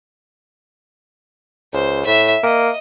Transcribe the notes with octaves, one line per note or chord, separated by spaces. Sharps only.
C#2 C5
A2 E5
A#3 D#5